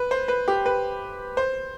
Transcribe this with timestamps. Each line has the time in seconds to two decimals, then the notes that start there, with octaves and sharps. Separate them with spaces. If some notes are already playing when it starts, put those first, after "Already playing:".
Already playing: B4
0.11 C5
0.28 B4
0.48 G4
0.66 B4
1.37 C5